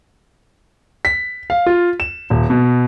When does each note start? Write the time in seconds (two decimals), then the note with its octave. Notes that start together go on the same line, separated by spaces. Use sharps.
1.05 B6
1.50 F5
1.67 F4
2.00 E7
2.30 D#1
2.50 B2